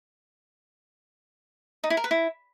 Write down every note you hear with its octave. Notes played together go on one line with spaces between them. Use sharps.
D#4
E4
A#4
B4
E4